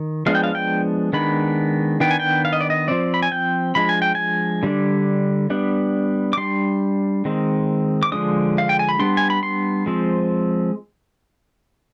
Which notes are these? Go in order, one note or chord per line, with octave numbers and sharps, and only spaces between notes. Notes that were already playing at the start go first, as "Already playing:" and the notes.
Already playing: D#3
F3 G#3 B3 D4 F5
G5
F5
G5
D#3 G#3 B3 D4 B5
D#3 B3 D4 G5
G#5
G5
F5
D#5
D5
D#5
F3 C4 D5
B5
G#5
G5
F3 G#3 D4 B5
G#5
G5
G#5
D3 G3 D4
G3 B3 D4
D6
G3 D4 C6
D#3 G#3 C4
D6
D3 F3 G#3 D4 D#6
F5
G5
G#5
B5
G3 B3 D4 C6
G#5
B5
C6
F3 G#3 C4